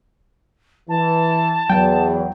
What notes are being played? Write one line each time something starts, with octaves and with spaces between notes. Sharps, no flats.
E3 A5
E2 F#3 G5